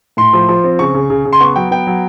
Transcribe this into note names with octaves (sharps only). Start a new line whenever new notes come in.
A2 C6
F3
F3
C4
C#3 C#6
C#3
C#3
C#3
C6
B3 C#6
F#3 G5
B3 G5
F#3